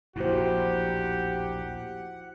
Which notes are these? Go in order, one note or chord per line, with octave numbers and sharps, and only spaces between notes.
A#1 D#2 A2 E4 F#4 G4 C5 F#5